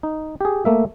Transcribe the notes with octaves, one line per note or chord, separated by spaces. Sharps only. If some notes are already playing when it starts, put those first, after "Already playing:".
D#4
G4 G#4
A3 A#3 E5